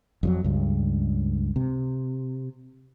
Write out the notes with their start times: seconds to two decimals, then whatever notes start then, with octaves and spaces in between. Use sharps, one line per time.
0.23 F2 F3 F#3
0.44 C#2 G2
1.56 C3